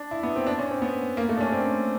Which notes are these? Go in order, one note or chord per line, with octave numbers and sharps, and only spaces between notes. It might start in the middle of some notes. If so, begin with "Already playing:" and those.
Already playing: D4
E4
B3
C4
D4
C#4
C4
B3
A#3
A3
D4
C#4
C4